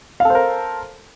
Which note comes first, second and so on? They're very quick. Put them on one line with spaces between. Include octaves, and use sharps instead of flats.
F5 A4 C5 A#4